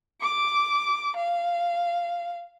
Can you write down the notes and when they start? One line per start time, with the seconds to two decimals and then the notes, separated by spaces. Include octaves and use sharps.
0.22 D6
1.16 F5